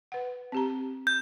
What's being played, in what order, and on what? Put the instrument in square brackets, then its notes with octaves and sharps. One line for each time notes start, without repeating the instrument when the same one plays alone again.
[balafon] B4 F#5
C4 G4 A#5
[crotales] G6